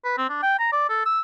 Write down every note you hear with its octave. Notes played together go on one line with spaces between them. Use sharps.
B4
C4
D4
G5
A#5
D5
A4
E6